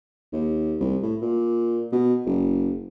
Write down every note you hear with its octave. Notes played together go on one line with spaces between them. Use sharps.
D#2
C2
A2
A#2
B2
F#1